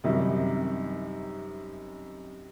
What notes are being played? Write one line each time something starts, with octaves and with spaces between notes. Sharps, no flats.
F#2 C3 D#3 G3 D#4 E4